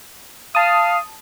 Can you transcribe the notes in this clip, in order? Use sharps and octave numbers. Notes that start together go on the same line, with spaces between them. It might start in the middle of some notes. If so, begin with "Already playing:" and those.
F5 A5 D#6